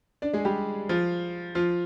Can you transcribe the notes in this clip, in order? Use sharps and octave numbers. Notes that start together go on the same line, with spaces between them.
D4 D5
G#3 G#4
G3 G4
F3 F4
F3 F4